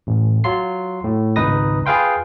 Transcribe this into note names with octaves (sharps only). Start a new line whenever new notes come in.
A1
F#3 F4 C6 C7
A2
G#1 C#2 D#4 B4 D#6 A#6
F4 G#4 B4 F5 G5 C6